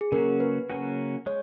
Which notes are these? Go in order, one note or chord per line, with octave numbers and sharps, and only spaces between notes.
G#4
C#3 F#3 A#3 C#4 F#4 A#4
B4
C#3 F#3 A#3 C#4 F#4
G#3 C#5